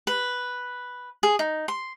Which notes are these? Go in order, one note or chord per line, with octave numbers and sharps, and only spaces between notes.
B4
G#4
D#4
C6